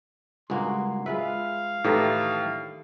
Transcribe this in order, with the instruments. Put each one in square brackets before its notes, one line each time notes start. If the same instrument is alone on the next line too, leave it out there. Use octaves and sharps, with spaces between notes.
[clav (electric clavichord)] C#2 G2 F#4 [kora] G#3 A#3 [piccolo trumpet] C6
[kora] G#3 F4 B4 [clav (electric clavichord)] E5 [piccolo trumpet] F5
[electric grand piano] A2 [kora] D#3 G4 A4 [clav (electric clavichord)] E3 D4 A#5